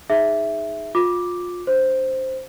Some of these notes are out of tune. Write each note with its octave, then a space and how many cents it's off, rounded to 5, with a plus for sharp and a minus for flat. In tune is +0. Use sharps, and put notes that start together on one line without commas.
D#4 +0 G#4 +0 E5 +0
F4 +25 D6 +0
D4 -10 C5 +0